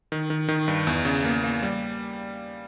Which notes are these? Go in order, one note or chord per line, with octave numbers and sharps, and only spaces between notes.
D#3
D#3
D#3
G2
E2
C#3
A#3
A#3
G3